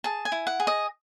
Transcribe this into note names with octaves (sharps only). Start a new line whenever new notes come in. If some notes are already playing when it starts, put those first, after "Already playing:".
G#4 A5
G#5
E4
F#5
G#4
D#5